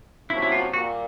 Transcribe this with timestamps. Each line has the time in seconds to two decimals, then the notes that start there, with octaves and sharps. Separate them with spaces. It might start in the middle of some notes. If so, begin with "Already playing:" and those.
0.30 C3 F3 A#3 C#4 E4 F#4
0.42 E4
0.52 F4
0.73 A#2 G3 A#3 F#4